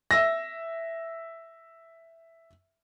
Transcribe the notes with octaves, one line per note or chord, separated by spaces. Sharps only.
E5 E6 A#6